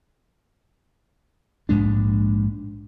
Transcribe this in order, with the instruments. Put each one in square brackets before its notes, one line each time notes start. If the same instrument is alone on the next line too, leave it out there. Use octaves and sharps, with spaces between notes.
[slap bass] A#1 G#2 G#3 D4